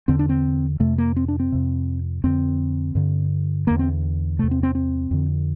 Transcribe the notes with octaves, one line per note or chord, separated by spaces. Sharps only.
E2 D3 C4
D4
C4
F2 C3 A3
A#3
C4
D4
C4
F2 C3
F2 D3 C4
G2 D3
E2 D3 A#3
C4
E2 C3 A3
C4
C4
C4
F2 D3